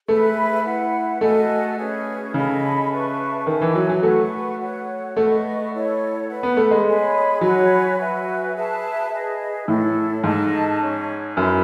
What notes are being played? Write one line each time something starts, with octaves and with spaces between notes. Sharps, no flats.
A3 G#4 B4 E5 B5
E4 B4 F#5
A3 F#4 A4 D#5 G#5
C#4 G#4 B4
C#3 A4 D#5 G#5 B5
B4 E5 A5 C#6
D#3 A4 E5 G#5
E3
F#3
F#3
A3 B4 F#5 C#6
F#4 A4 C#5 F#5
A3 B4 D#5 F#5 C#6
E4 A4 C#5
B4 F#5 B5
B3
A3
G#3
G#4 C#5 G#5 B5
F#3 F#4 C#5 G#5 B5
F#4 B4 E5 G#5
G#4 B4 E5 A5
G#4 B4 D#5
A2 E4 A4 C#5
G#2 D#4 A4 D#5 A5
C#4 G#4 C#5
F#2 E4 B4 E5 B5